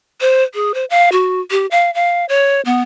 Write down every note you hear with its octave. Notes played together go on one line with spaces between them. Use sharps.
C5
G#4
C5
F5
F#4
G4
F5
F5
C#5
B3